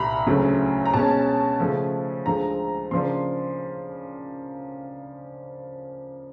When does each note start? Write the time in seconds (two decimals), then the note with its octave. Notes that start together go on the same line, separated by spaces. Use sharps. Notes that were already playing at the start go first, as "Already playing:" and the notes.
Already playing: C2 A#2 G3 A#5 B5
0.27 D2 C#3 F#3 A3
0.85 A#5
0.93 B2 G#3 C#4 A5
1.60 C#3 F3 A3
2.26 D2 D3 F3 G#3 A#5
2.91 C#3 F3 A#3 D4 C6